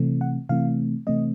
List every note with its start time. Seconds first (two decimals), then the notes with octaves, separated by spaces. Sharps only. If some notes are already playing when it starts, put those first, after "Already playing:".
Already playing: C3 E3 A3 C4
0.21 F#5
0.49 C3 E3 A3 C4 F5
1.07 C3 E3 A3 C4 D#5